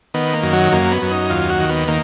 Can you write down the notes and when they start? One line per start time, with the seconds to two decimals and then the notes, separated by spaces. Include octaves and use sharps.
0.14 D#3 B3
0.33 A#3
0.43 F#2
0.53 F#3
0.72 F#2 A#3
0.92 B3
1.02 F#2
1.11 D#4
1.30 D#2 F4
1.50 F#4
1.60 D#3
1.69 B3
1.88 D#3 A#3